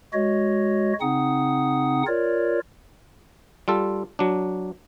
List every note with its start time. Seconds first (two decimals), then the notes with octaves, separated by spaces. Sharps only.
0.13 G#3 F#4 C#5 D#5
1.01 C#3 C4 D#4 F#5 D#6
2.07 F4 A#4 C#5 D5
3.68 G3 F4 A4
4.19 F#3 D4